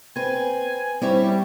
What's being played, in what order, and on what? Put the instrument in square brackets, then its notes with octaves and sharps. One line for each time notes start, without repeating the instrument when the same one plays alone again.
[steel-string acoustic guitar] C4 B4 [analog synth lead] G#5
[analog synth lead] G3 [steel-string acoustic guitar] C4 E4 C#5